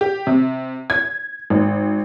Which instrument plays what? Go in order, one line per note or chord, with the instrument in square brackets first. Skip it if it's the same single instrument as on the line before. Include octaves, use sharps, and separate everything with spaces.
[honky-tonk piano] G4
C3
G#6
G#1